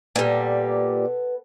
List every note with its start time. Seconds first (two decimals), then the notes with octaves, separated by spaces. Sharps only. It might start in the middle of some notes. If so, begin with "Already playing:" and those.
0.16 A#2 G3 B3 A4